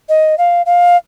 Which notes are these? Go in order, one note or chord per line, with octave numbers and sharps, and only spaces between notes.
D#5
F5
F5